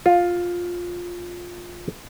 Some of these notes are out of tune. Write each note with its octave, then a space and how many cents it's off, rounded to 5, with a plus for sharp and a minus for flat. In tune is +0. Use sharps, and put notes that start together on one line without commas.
F4 +10